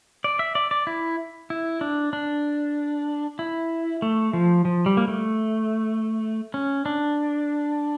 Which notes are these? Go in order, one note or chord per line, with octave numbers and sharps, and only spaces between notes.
D5
E5
D5
D5
E4
E4
D4
D4
E4
A3
F3
F3
G3
A#3
A3
C#4
D4